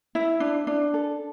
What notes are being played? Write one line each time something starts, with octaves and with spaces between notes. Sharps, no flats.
E4
D4
D4
A4